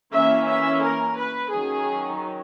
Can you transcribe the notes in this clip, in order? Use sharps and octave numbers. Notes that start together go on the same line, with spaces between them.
E3 A#3 C#4 E5
E5
A#4
B4
D#3 F#3 C#4 G#4